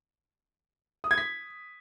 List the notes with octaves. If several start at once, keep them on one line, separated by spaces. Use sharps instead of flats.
D#6
G#6
B6